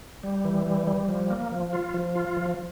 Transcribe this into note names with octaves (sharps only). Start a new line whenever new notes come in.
G3
E3
G3
G3
F3
A#3
F3
F4
F3
F4
F3